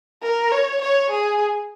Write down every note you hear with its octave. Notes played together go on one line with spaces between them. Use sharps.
A#4
C#5
C#5
G#4